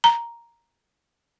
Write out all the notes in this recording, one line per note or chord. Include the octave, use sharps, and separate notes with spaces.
A#5